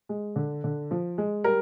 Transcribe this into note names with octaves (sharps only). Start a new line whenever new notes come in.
G#3
D3
D3
F3
G#3
G3 A#4